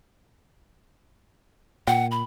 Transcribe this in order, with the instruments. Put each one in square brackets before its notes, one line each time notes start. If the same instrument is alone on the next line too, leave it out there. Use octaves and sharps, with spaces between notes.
[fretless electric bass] A#2 [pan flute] F#5 [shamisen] G5
[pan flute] B5